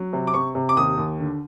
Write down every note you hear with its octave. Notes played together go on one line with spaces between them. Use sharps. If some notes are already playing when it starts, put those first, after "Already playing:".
Already playing: F#3
C3
D6
C3 C#6
C3
D6
D#2 D#6
D#2
D3